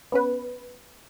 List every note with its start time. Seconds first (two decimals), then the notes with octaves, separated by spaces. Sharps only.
0.12 B3 C#4 B4